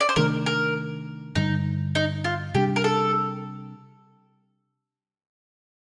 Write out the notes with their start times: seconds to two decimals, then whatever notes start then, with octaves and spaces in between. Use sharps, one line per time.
0.01 D5
0.09 C5
0.16 C3 D#3 A3 D4 A#4
0.46 A#4
1.35 G2 D3 G3 D#4
1.95 D#4
2.24 F4
2.55 C3 G3 D4 G4
2.76 A#4
2.84 A4